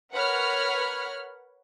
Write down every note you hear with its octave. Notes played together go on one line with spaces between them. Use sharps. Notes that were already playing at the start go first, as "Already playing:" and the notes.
A#4 B4 C#5 F#5 B5 F6